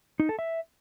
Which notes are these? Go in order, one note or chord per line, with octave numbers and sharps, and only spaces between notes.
D#4
A4
E5